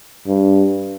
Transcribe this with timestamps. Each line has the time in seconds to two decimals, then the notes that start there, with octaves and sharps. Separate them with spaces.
0.27 G2